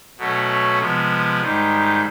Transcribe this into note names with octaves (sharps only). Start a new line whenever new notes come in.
B2 F#3 A3 C#4
C3 F3 G#3 B3
G#2 D#3 G3